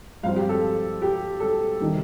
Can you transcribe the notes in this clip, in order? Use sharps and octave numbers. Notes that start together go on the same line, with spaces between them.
G2 F3 C4 F5
G4
A4
G4
A4
C3 D#3 G3